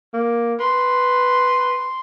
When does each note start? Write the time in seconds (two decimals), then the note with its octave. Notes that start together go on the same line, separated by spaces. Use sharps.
0.14 A#3
0.60 B4 C6